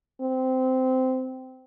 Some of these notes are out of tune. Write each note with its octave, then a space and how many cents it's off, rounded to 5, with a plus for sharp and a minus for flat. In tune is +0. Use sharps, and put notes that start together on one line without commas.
C4 -15